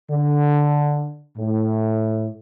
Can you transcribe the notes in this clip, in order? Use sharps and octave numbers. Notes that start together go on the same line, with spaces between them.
D3
A2